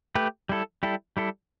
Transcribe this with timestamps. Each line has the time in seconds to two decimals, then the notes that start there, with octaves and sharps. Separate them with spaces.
0.15 A3 G4 B4
0.49 G3 E4 A4
0.83 G3 E4 A4
1.17 G3 E4 A4